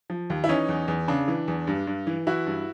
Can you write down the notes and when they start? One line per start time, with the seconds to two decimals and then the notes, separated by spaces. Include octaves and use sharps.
0.10 F3
0.30 D#2
0.44 E4
0.48 E3 C#4 D#4
0.69 E2
0.88 E2
1.08 C#3 D4
1.28 E3
1.48 E2
1.67 G2
1.87 G2
2.07 E3
2.27 E3 E4 F#4
2.46 G2